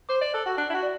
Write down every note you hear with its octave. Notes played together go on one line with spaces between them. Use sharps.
C5 D6
D5
A4 F#6
F#4
D4 F#6
E4
F#4
D5